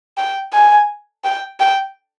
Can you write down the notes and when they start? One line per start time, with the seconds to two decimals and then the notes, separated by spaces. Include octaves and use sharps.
0.18 G5
0.53 G#5
1.24 G5
1.60 G5